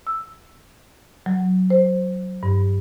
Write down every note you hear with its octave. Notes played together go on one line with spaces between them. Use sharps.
E6
F#3
C5
G2